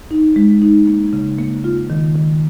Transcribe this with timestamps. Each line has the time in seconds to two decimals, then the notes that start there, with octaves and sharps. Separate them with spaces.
0.11 D#4
0.36 G#3
0.62 D#4
0.87 A#3
1.13 C#3
1.39 A#3
1.64 F4
1.90 D#3
2.15 D#3